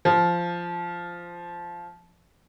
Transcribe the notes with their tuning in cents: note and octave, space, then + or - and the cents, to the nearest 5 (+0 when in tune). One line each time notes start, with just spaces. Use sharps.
F3 -10